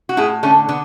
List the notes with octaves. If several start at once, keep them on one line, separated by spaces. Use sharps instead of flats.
F#4
A2 E4 G#4
D3 A3 C#4
D3 B3